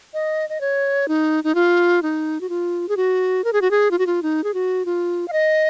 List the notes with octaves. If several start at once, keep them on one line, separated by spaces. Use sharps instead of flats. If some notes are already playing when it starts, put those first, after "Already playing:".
D#5
D#5
C#5
D#4
D#4
F4
D#4
F#4
F4
G#4
F#4
A#4
G#4
F#4
G#4
F4
F#4
F4
D#4
G#4
F#4
F4
F5
D#5